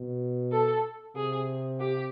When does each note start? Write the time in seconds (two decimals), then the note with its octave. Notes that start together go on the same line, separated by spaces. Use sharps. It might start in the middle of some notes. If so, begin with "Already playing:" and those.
Already playing: B2
0.51 A4
1.16 C3 G#4
1.80 G4